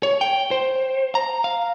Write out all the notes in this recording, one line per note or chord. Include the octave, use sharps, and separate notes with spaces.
C#5
G5
C5
A#5
F5